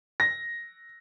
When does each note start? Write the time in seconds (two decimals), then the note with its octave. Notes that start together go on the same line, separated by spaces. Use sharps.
0.20 A#6